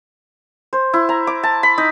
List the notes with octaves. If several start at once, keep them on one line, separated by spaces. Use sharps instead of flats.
C5
E4
A#5
D6
A5
B5
D#4